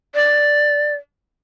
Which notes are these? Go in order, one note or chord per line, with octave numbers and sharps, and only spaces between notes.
D5